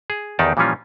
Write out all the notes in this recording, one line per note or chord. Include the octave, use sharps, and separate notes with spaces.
G#4
E2 D#3 D#4 G4 D5 A5
A#2 E3 F3 G3 C#4 F4